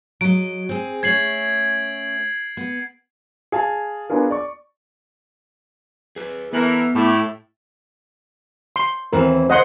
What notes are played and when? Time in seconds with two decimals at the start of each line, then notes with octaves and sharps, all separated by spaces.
0.21 F#3 D#5 D7
0.69 C4 G#4
1.03 A3 C#4 G#6 C7 F#7
2.57 B3
3.52 G#4 F5 A5
4.10 B3 D4 F4 G#4 A#4
4.30 D5 C#6
6.16 G#4 B4
6.53 E3 B3 A4 A#4
6.95 A2 A3 E4 G4
8.76 C6
9.13 D#2 E3 C4 A#4
9.49 D#2 C5 D#5 F#5 C6